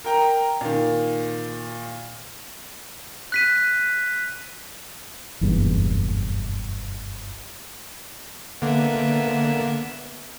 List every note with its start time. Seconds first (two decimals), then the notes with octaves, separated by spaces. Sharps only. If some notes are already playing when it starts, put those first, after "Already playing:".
0.04 A#4 G5 A#5
0.61 A#2 D#3
3.32 F#6 B6 D#7
5.41 F#1 B1 E2 G2
8.62 D3 A#3 B3 E5